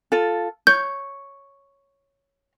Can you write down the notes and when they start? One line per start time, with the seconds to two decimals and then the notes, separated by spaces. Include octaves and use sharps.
0.12 F4 A4
0.67 C#5 G6